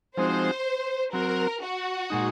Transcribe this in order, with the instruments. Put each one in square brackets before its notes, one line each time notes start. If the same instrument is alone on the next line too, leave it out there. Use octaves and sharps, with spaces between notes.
[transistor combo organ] F3 G#3 C4 D#4 F#4 [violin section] C5
[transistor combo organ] F#3 C4 F#4 [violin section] A#4
[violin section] F#4
[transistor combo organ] A#2 G#3 D#4